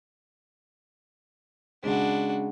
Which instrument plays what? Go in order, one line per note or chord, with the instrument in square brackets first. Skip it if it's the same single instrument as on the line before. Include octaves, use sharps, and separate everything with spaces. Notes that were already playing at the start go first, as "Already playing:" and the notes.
[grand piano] C#3 G#3 [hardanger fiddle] D4 F#4